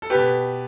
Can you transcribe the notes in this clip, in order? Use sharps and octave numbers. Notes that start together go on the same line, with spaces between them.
A4
B2 G4 B4